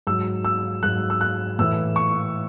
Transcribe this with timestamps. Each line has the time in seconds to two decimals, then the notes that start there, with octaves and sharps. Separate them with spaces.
0.07 G#2 F#3 E6
0.45 E6
0.83 G#2 F#3 F#6
1.10 E6
1.21 F#6
1.59 A2 E3 E6
1.96 C#6